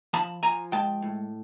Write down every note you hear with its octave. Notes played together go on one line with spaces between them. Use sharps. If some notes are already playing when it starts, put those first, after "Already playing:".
F3 A5 B5
F3 G#5 A#5
G#3 G5 A5
A2